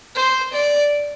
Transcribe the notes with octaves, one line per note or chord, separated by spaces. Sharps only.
C5
D5